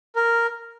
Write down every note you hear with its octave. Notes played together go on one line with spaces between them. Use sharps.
A#4